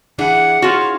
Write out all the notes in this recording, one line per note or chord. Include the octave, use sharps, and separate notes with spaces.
E3 D4 E4 G#4 F#5
F4 F#4 C#5 F5